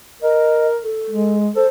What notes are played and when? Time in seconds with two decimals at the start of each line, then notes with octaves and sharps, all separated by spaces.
0.22 A#4 D#5
0.83 A4
1.11 G#3
1.56 A4 C5